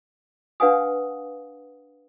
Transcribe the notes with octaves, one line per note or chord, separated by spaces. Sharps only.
D4 B4 F5 F#5 G#5 D#6